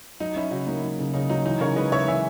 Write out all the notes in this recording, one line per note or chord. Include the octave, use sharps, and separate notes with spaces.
F#3 D#4
F#3 C#4 E4
C#3 D#4 F#4
A#3 D#4
F#3
C#3
C#3 D#4
F#3 D#4
E3 D#4
C#3 A#4 C#5
G#3 B4 D#5
C#3 C#5 E5
E3 E5 G#5